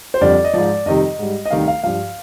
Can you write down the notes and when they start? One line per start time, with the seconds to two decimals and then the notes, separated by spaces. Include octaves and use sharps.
0.14 C5
0.21 F2 D3 G3 D5
0.44 D#5
0.53 G#2 F3 D5
0.86 F2 C3 D#3 G3 D#5
1.19 G#2 G3
1.45 D#5
1.51 D2 C3 D#3 G3 F5
1.68 F5
1.83 G2 F3 F5